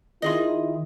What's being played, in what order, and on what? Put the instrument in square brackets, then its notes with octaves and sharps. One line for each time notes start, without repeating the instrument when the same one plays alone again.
[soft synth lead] D#3 [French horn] E4 [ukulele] F4 G#4 D#5